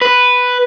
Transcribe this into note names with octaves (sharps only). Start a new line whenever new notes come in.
B4